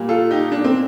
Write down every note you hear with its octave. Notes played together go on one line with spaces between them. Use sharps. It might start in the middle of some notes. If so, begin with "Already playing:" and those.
Already playing: A#2 G3 A#3
F4 A4
D#4 G4
D4
C4